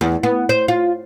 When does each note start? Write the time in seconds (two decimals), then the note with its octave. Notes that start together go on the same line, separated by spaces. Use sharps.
0.01 E2
0.23 B3
0.49 C5
0.68 F4